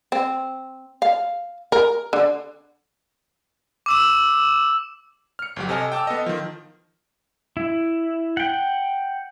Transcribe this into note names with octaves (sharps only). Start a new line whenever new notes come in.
C4
F5
A#4
D3
D6 E6 E7
F6 C#7
G1 F#3 G4
C3 A4 D#5 G#5 F6
G5 A5 D6 E6
B3 A4 D#5
D#3 F3
E4
F#5 G5